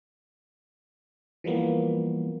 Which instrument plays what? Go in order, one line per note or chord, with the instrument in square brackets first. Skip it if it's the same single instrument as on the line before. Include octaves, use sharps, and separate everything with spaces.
[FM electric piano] E3 F3 G3 A#3 B3